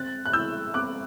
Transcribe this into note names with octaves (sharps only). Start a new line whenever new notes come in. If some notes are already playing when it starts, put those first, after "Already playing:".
Already playing: C4 F#6 A6
F#6
E4 E6 G6
C4 D6 F#6